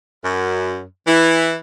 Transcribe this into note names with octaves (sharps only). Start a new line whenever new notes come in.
F#2
E3